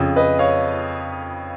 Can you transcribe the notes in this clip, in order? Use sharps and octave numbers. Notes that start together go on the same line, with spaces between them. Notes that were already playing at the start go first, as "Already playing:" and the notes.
Already playing: F2 C#3
B4 D#5
C#5 F5